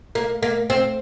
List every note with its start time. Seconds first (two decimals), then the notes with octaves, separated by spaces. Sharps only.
0.15 A#3
0.43 A#3
0.70 C4